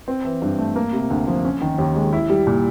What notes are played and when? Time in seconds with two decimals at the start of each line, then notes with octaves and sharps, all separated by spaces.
0.08 C4
0.25 E3
0.42 G2
0.58 A3
0.76 A#3
0.93 C3
1.10 D2
1.27 F3
1.44 C#4
1.61 D#3
1.78 D#2
1.96 G#3
2.13 E4
2.30 G3
2.47 A#2